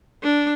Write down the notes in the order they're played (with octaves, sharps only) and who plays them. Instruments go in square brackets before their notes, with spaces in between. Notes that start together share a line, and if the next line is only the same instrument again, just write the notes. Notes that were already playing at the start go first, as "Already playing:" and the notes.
[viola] D4